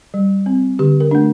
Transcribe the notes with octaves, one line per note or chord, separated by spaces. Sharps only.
G3
C4
D3 G4
A#4
A3 D4